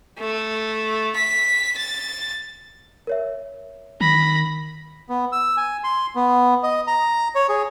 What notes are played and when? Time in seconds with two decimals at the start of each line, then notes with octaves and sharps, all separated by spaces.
0.19 A3
1.16 B6
1.77 A6
3.07 A#4 C#5 E5
4.01 D#3 B5 A#6
5.09 B3
5.32 E6
5.57 G#5
5.84 C6
6.16 B3
6.63 D#5
6.87 A#5
7.35 C#5
7.49 G#4